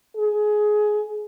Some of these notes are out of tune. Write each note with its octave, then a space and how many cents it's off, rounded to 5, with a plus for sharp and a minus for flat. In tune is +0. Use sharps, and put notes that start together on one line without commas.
G#4 +20